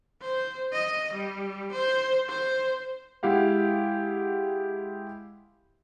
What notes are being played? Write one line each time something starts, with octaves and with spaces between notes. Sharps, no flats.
C5
D#5
G3
C5
C5
G#3 E4 G4 F5 F#5